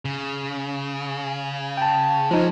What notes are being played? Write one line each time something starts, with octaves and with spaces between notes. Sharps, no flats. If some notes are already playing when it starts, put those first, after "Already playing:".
C#3
G5 A5
F3 G#3 C#4 D#4